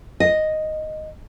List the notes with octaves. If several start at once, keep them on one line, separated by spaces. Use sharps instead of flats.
D#5